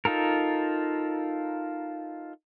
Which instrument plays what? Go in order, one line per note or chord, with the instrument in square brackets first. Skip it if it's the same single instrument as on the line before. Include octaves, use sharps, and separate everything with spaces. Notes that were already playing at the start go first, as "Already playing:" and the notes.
[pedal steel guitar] D#4 F4 A4 A#4